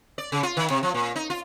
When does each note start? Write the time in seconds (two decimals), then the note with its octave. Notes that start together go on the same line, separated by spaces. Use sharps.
0.18 D5
0.32 C#3
0.43 F4
0.57 D#3
0.70 C3
0.83 F3
0.94 A#2
1.16 D#4
1.30 F4